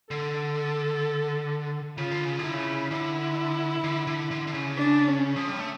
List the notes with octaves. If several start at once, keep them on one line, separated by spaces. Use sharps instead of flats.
D3 A4
C#3 F4
D3
C#3
D3
E4
C#3
D3 E4
D3
D3
D3
D3
C#3
D4
C#4
F3
G3
A3